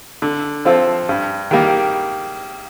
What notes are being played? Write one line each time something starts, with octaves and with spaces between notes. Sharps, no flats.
D3
F3 C4 F4 A4
G2
D#3 G3 A#3